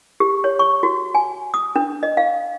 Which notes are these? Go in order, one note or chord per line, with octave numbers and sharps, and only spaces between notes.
G4
C#5
C#6
F#4
G#5
D#6
D4
D#5
F5